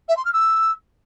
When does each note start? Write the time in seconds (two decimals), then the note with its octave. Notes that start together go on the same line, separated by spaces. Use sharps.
0.08 E5
0.16 C6
0.25 F6
0.33 E6